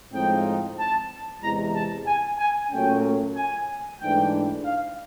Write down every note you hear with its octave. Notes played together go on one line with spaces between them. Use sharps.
A2 F3 G#3 C4 D#4 G5
A5
E2 C3 E3 G#3 A#5
A5
G#5
G#5
A#2 F#3 A3 C#4 G5
G#5
G#2 E3 A3 D4 G5
F5